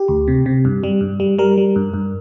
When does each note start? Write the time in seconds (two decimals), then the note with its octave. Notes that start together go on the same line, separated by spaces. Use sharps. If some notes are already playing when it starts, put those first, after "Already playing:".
Already playing: G4
0.08 D2
0.28 C3
0.46 C3
0.65 G2
0.83 G3
1.01 G2
1.20 G3
1.38 G3 A#4
1.58 G3
1.76 G2
1.94 G2